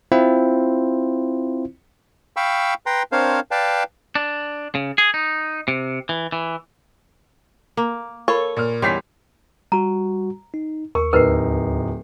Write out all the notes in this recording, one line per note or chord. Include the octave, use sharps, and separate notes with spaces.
C4 E4 F4 C5
F5 G5 B5 C#6 E6
B4 G5 A#5 C6
C4 D4 A#4 C5 C#5 F5
B4 D5 F5 G5 A5
D4
C#3
G#4
D#4
C3
E3
E3
A#3
F4 A4 A#4 C#5 B5 C#6
A#2 F6
E2 D#3 G3 C#4 C#5 F5 C6 B6
G3 F#4 A#5
D#4
D#2 A#4 C#6
D1 D#4 A#4 B4 C7